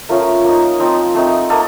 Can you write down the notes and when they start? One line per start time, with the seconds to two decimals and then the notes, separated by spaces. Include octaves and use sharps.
0.09 F3 A3 C#4 F4 A#4
0.44 A#3 D#4
0.80 F3 C4 D#4
1.15 A3 C4 D#4
1.50 A#3 D#4 A4